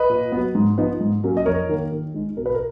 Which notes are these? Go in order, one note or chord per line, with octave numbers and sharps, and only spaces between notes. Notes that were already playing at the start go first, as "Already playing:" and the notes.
Already playing: B4 D#5
A#2
F#3 B3
G#2
F3 B3 D#4
G#2
F#3 A#3 C#4
D#5
F2 A#4 C#5
D#3 A#3
D#3
G#3 D#4
B2 A#4
B4
A#4